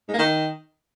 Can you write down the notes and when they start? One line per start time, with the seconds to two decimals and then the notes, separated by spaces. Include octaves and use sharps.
0.08 G#2
0.13 A#3
0.18 D#3